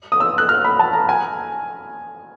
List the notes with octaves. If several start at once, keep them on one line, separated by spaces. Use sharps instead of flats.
D#6
E6
F#6
F6
B5
A5
A#5
G#5